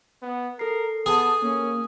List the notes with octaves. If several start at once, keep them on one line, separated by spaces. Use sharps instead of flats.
B3
A4 A#4 C7
B3 G#4 A5
A#3 C#4